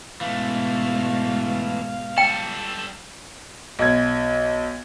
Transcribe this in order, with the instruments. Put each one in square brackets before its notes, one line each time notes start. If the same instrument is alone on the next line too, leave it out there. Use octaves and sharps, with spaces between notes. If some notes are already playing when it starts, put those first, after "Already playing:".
[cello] G#2 B2 [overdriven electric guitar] E3 A3 [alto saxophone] F5
[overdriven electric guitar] G3 A4 [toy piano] G5
[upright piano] B1 G#6